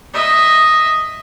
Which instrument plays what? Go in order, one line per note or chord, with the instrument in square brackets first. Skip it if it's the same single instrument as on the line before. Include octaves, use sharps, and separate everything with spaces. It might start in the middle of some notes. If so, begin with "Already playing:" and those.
[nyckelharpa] D#5 E5